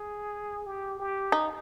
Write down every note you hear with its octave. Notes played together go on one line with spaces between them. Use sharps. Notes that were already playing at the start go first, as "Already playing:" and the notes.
Already playing: G#4
G4
G4
D#4